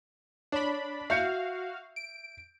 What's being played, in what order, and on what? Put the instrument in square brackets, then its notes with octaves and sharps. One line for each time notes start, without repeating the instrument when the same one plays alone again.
[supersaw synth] D4 B5 [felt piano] C#5
[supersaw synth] F#4 F5 [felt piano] E5 G6 C#7
[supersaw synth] D7